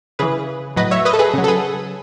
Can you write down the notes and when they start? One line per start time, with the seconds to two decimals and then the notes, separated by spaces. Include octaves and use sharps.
0.19 C#3 E3 G#4 B4
0.76 A2 F#3 B4 D#5
0.91 C#5 E5
1.05 B4 D#5
1.13 A4
1.19 G#4 B4
1.34 C#3 F#3
1.44 A4
1.48 G#4 B4